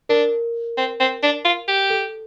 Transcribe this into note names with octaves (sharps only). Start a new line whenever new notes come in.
D4 A#4
C4
C4
D4
F4
G4
A4